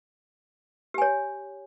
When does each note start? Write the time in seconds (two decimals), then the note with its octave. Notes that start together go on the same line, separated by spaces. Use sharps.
0.94 G4
0.98 G#5
1.02 C#5